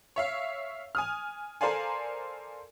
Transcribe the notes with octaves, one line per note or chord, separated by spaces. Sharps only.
C#5 E5 F5
G#5 D#6 F6
A4 A#4 C5 D5 F5 G#5